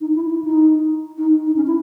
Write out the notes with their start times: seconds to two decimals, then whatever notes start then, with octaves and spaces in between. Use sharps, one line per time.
0.01 D#4
0.15 E4
0.30 E4
0.44 D#4
1.17 D#4
1.47 D#4
1.56 C#4
1.66 E4